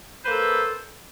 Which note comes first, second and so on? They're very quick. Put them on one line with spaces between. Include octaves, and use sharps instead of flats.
B4 C5 A#3 A4